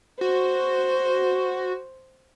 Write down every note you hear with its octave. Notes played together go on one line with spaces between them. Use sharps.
F#4 C5